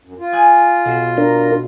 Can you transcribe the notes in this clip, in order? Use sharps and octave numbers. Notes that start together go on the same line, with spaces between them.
F#2
F4
G#5 D#6 F#6
B1 F#4 C7
D4 A#4